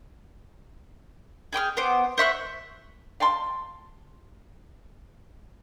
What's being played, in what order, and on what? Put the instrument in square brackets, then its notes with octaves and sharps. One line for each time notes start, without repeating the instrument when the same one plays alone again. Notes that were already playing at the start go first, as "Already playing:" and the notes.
[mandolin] G#4 G5 D6 F6
B3 C5 D6
C5 E5 C#6 F#6
[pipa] F5 G5 A5 C6